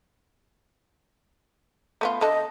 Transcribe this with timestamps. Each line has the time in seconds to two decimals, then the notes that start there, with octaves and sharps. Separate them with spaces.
2.01 A3 B3 F4
2.21 D3 A4 D#5